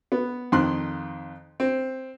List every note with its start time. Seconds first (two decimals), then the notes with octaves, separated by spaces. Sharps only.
0.12 B3
0.52 F2 D#3 C6 F#6
1.60 C4